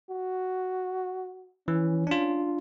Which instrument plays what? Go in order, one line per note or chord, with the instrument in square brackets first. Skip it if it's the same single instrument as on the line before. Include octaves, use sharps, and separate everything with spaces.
[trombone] F#4
[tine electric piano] E3 [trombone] C#4
[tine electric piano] D4 F4